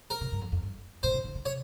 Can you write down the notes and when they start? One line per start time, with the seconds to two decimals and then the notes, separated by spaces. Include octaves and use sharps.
0.10 A#4
0.21 C3
0.32 G2
0.41 F2
0.52 F2
0.62 G2
1.03 B2 C5
1.11 D3
1.14 C#3
1.25 D3
1.35 D3
1.45 C3 C#5